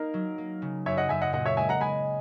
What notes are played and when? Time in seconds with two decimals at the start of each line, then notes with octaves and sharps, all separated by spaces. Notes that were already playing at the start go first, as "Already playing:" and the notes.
Already playing: A#3 D#4 A#4
0.14 F#3
0.38 A#3
0.62 C#3
0.86 F#2 C#5 E5
0.97 D#5 F#5
1.09 F#2 E5 G#5
1.22 D#5 F#5
1.33 A#2 D#5 F#5
1.46 C#5 E5
1.57 G#3 E5 G#5
1.69 F#5 A#5
1.81 G#3 G#5 B5